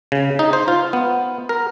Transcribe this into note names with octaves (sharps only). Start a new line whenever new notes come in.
C#3
D#4
C5
F4
B3
A#4